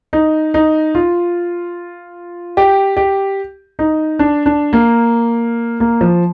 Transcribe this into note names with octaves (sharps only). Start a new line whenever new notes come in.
D#4
D#4
F4
G4
G4
D#4
D4
D4
A#3
A#3
F3